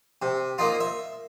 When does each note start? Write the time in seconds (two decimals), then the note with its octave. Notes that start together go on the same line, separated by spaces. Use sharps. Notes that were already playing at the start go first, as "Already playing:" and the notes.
0.22 C3
0.58 A#3 D#4 F4
0.80 E5